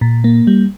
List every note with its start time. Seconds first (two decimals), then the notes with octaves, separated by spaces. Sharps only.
0.01 A#2
0.24 A#3
0.47 G3